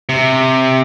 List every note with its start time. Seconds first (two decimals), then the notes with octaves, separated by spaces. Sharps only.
0.09 C3